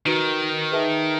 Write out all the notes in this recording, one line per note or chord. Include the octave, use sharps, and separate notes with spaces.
D#3 D#4 F#4 B4
G#4 B4 E5 A5